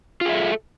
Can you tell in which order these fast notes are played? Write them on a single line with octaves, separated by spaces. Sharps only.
F4 G#4 E5 A4